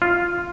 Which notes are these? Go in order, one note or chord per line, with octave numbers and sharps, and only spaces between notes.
F4